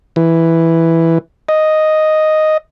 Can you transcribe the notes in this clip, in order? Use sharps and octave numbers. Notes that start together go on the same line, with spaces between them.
E3
D#5